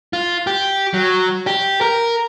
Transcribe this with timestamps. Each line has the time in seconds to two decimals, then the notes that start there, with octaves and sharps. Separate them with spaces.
0.13 F4
0.47 G4
0.94 F#3
1.47 G4
1.81 A#4